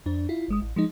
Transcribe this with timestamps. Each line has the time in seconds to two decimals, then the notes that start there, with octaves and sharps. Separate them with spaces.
0.06 F2 D4
0.29 E4 F4
0.48 G1 G#3 D#6
0.62 A1
0.76 F3 G#3 D#4